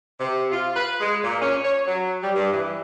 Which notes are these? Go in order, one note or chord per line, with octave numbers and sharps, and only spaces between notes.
C3
F4
B4
G#3
A#2
C#4
C#5
F#3
G3
G2
E3